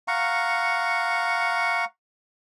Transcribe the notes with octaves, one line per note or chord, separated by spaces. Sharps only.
F5 F#5 A#5 C#6